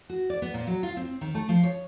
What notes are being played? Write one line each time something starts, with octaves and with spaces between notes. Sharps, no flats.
F#4
D5
B3
A#2
F#3
F4
C4
D#3
A3
F3
C#5